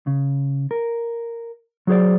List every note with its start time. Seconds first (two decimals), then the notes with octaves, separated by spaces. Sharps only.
0.07 C#3
0.71 A#4
1.87 F#3 F#4 G#4 C5 D5